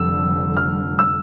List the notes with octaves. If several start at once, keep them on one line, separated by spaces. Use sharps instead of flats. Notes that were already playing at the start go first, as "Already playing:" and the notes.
Already playing: F1 F2 D3 G3 E6
F6
E6